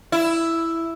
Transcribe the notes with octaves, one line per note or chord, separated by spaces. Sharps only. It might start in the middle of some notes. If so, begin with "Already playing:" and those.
E4